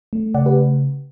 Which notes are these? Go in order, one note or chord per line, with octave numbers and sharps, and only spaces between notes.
A3
C#3 D5 F#5
G4 B4